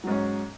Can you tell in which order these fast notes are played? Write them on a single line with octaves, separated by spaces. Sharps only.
F#3 G#2 C#4